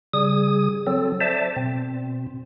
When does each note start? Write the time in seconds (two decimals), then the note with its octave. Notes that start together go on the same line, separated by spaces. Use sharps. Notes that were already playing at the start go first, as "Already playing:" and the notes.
0.14 C#3 G3 G#4 D#6
0.87 F#3 C4 A4
1.21 C5 D5 E5 A5
1.56 B2 C4